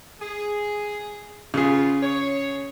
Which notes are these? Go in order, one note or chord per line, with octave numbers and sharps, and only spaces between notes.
G#4
C#3 B3 F4 G#4
C#5